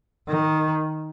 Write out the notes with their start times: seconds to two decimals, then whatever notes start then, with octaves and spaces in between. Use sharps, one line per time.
0.28 D#3